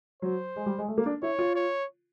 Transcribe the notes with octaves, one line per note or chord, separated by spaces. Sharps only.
F#3 C5
G#3
G3
G#3
A3
A#3
D4
E4 C#5
F4
C#5